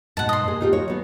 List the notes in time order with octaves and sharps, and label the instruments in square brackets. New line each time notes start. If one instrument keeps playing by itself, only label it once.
[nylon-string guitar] G#2 B2 [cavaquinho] F#5 A5
[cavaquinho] D#5 C6
[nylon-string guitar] A#2 G#4
D#4 F4 G4
F#4 C#5
F#3 B3